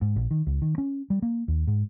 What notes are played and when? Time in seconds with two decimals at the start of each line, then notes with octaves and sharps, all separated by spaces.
0.02 G#2
0.16 A#1
0.31 D#3
0.47 C#2
0.62 D#3
0.78 C#4
1.10 G3
1.22 A#3
1.48 D#2
1.67 G#2